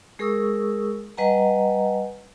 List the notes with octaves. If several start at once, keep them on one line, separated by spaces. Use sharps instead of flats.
G#3 G#4 A#4 C#6 D#6 E6
G3 B4 D#5 F#5 G#5 A#5